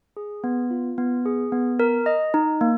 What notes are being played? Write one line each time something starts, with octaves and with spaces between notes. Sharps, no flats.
G#4
B3
F4
B3
G#4
B3
A#4
D#5
D#4
A#3